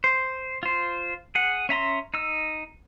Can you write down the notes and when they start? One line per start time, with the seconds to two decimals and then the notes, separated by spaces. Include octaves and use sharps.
0.04 C5
0.63 F4 C5
1.35 G#4 F#5
1.69 C#4 E5 A#5 C6
2.14 D#4 E6